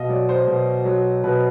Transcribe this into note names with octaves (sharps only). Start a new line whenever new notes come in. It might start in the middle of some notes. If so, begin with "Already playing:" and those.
Already playing: B2 D#5 F5
F#3 D5
C5
B2
F#3
B2 B4